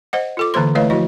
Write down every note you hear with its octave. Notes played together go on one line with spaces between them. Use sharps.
C5 D#5 F#5
F4 A4 D6
D3 E3 A#3 C5 C6
A3 E4 B4 C#5 D#5 F5
F3 E4 F#4 D#5